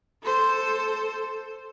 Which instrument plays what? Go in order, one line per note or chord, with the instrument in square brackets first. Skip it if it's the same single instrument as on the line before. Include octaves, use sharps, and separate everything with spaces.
[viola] A4 C5